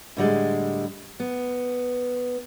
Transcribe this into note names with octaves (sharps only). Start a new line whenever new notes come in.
A2 D3 G3 G#3
B3